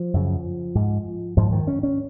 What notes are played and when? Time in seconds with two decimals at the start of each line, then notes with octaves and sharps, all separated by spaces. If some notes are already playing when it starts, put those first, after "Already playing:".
Already playing: F3
0.14 F#2 C#3
0.75 G#2
1.37 G#2 F3
1.52 D#3
1.67 C#4
1.83 C#4